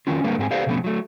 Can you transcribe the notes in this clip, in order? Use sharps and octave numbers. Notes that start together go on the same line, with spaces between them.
D#3 F#3 C#4 F4
D3 G3 A#3 G#4 A#4 B4
G#2 C4 G4 G#4 G#5
G4 A4 B4 C5 D5 F5
B2 D3 F3 A3 B3 C#4
F#3 A3